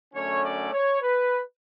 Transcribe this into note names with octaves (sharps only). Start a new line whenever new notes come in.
F#2 D3 A3 C#4 C#5
D5
C#5
B4